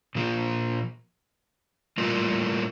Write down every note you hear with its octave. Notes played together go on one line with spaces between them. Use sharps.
A#2 F3 A#3
A2 G3 A#3 F4 A#4